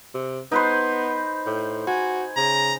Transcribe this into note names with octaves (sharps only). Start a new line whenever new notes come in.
C3
B3 D#4 B4 C5
A2
F#4 G#5
C#3 A#5